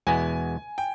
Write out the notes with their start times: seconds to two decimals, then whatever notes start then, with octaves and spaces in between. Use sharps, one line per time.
0.07 E2 B2 G#3 B3 E4 G#5
0.78 G5